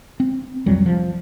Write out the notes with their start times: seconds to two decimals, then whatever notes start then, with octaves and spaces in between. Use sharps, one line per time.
0.20 C4
0.66 C2 F2 F#3 G3
0.86 F3